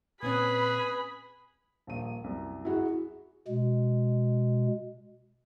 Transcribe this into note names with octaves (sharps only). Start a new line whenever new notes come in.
A#2 C4 C#4 G#4 B4 B5
D#1 A#1 D#7
C2 F#2
E4 F#4 G#4
B2 G#3